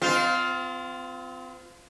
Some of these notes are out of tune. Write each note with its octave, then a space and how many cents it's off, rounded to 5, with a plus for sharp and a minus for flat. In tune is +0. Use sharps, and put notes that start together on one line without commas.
C4 -35 F4 +0